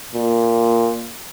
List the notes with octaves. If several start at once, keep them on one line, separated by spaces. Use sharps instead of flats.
A#2